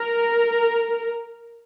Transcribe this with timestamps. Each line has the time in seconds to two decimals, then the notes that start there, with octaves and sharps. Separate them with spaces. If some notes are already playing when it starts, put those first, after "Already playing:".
Already playing: A#4